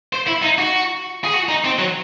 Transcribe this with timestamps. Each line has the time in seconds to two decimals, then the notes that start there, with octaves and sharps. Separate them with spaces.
0.13 C5
0.27 E4
0.43 D#4
0.58 F#4
1.24 G#4
1.34 F#4
1.49 D#4
1.64 C4
1.79 F#3